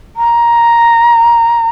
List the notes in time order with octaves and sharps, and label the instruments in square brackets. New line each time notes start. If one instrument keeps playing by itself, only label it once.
[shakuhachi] A#5